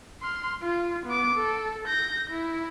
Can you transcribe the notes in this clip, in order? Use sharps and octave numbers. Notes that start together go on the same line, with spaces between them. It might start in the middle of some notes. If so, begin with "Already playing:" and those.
C6 F6
F4
B3 D6
A4
G6 A#6
E4